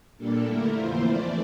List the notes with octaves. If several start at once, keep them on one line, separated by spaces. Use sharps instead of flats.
A#2 G3 A#3 D4 A4
D3 A3 E4 A#4
F2 E3 A#3 F4 C5
F2 E3 A3 E4 D5